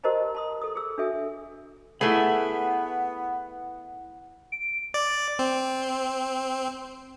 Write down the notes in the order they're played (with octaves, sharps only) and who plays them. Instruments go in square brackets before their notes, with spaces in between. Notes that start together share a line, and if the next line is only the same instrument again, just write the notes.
[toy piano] G4 A#4 C5 D#5 A5 A#5
A5 C6 D#6
A4 D#6
G#4 E6
D4 F#4 A4 E5 G#5
[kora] A3 G#4 [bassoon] B3 [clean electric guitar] E4 E5 B5 [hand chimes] F#5
[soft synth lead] D7
[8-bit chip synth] D5
C4